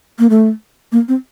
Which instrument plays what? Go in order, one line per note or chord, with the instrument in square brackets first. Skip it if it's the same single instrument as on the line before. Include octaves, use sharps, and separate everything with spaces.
[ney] A#3
A3
A#3
C4